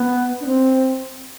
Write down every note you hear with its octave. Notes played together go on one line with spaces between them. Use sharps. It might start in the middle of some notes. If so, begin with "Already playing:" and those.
Already playing: B3
D4
C4